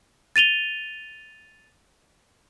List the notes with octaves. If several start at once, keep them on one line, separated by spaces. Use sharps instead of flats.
A6 D#7 F7 G7